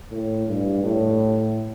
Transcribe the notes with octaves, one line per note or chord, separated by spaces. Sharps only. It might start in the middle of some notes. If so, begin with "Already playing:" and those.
A2
G2
A2